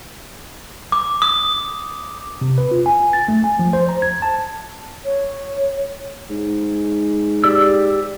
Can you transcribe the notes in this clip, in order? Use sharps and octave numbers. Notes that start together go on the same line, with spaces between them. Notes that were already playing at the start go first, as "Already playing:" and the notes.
D6
D#6
C3
B4
F4
G#5
A6
A3
G#5
F3
C5
A#5
G#6
A5
C#5
G#2
G4 D5 E6